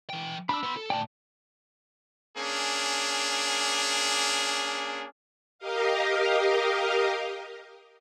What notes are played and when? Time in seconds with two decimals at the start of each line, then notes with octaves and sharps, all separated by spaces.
0.10 E3 G5
0.49 D4 B5 E6
0.63 B3 C6
0.77 A4
0.90 A2 D5 G5 A5
2.37 A#3 C#4 D4 G#4
5.59 G4 A#4 D#5 F5